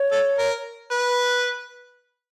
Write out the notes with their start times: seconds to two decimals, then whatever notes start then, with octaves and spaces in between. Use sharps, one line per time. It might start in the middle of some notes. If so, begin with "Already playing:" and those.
Already playing: C#5
0.12 A4
0.38 A#4
0.91 B4